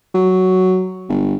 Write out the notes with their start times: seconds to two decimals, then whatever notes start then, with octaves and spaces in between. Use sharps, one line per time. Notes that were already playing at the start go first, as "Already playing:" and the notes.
0.15 F#3
1.09 G1